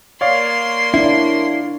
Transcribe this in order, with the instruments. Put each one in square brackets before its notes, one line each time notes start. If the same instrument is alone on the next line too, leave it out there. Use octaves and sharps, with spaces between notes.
[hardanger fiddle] A#3 C6 [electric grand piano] C#5 D5 F5
[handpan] D4 [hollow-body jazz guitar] E4